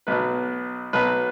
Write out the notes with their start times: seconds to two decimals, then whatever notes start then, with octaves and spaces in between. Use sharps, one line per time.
0.07 B1 B2 F#3 B4
0.93 B1 B2 F#3 B4